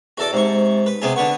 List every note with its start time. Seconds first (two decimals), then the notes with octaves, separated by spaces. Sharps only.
0.18 E2 F#4 A4 D5
0.33 G#2 C3 C#6
0.86 B4
1.02 C3 B3 G#4
1.16 D3 B3 B4 C#6